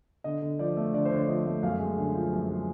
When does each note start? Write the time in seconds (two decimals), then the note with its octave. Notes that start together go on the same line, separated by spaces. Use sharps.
0.24 D3 D#5
0.42 D3
0.59 F3 D5
0.77 A3
0.94 D3 D5
1.05 C5
1.11 D3
1.17 C#5
1.28 F3 D#5
1.46 A3
1.63 F#2 F5
1.80 G#3
1.97 D3
2.15 F3
2.32 F#2
2.49 G#3